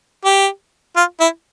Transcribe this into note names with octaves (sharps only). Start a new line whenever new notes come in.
G4
F4
E4